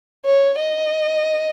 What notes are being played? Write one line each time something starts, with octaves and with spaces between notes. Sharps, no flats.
C#5
D#5